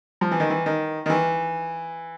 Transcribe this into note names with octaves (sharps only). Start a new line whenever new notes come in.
F3
E3
D#3
E3
D#3
D#3
E3